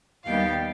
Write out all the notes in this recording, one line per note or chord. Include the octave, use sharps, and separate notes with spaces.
D#2 D#3 G3 B3 F5 G5